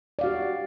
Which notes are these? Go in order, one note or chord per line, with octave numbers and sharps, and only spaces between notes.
F#4 G4 D5 F5